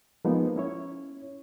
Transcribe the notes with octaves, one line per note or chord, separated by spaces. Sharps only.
F3 G#3 A#3 B3 D#4
C#4 E4 C#5